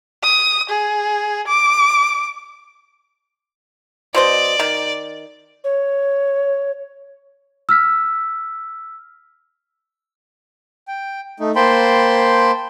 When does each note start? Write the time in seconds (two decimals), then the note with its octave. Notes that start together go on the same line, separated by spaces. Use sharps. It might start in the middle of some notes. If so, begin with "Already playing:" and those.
0.24 D#6
0.69 G#4
1.47 D6
4.14 B2 C5 D5 D#5
4.59 D#3
5.64 C#5
7.69 E6 F6 B6
10.88 G5
11.40 A3 D#4
11.56 A#3 C5 G5 A5 B5 C6